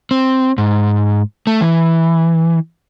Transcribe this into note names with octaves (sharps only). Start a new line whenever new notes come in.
C4
G#2
A3
E3